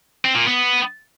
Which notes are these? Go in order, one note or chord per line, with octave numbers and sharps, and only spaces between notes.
C4
A#2
B3